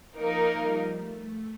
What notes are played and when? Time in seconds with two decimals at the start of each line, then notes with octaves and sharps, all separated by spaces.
0.19 F3 A#3 D#4 A#4
0.58 G3
0.97 A3